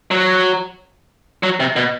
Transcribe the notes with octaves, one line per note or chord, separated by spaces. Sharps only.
F#3
F#3
C3
B2